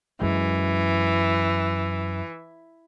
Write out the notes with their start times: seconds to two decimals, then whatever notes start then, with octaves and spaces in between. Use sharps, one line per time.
0.22 F#2 E3 G#3